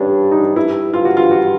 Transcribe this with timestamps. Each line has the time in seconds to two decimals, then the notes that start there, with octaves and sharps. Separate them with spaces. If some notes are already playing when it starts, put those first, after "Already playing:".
Already playing: G2 C#4 D4
0.32 D#4
0.56 G2 E4
0.93 G2 F4
1.05 F#4
1.17 F4
1.31 F#4